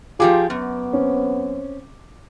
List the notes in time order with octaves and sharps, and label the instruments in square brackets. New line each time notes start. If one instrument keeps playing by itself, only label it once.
[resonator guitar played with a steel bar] F3 G4 G#4 [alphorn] F4 [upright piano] D6
[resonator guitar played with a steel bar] F#2 [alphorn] B3
[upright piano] C4 C#4